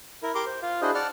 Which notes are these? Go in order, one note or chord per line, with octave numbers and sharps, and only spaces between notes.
E4 A#4
G4 A#4 C6 D6
C5
F4 F5
D4 E4 F#4 G#4 C5 D#5
D5 F#5 A5 F6